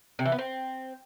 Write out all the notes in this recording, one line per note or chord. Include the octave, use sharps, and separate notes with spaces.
C3
E3
B3
C4